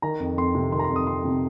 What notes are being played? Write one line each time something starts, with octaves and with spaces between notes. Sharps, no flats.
D#3 A#5
F2
F2 C6
C3
D#3 C6
A#5
C6
F2
D#6
F2 C6
C3